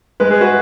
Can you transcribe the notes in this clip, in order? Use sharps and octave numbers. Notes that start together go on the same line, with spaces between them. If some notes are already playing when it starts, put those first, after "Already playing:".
G#3 B4
G#4
F#4 B4